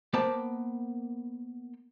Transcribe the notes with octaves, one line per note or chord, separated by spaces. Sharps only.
A#3 B3 C5 G5 A5